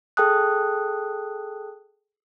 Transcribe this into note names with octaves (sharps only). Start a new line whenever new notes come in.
G#4 A4 G5 A5 D#6 F#6